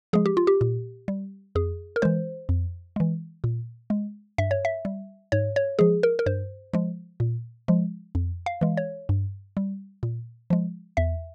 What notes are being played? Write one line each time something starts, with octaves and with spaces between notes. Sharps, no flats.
F3 G#3 G#4
G4
F4
G4
A#2
G3
F2 G#4
A#4
E3 G#3 C5
F2
E3 G#3
A#2
G#3
G2 E5
C#5
E5
G3
G#2 C#5
C#5
F3 G#3 G#4
A#4
A#4
G2 C5
F3 G#3
A#2
F3 G#3
F2
F5
E3 G#3
C#5
G2
G3
A#2
F3 G#3
E2 E5